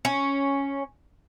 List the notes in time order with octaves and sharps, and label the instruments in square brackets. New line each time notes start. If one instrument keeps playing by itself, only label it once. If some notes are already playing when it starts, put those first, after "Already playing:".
[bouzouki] C#4